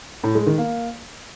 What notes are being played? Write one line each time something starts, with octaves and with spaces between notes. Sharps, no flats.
A2
G#3
D#3
A#3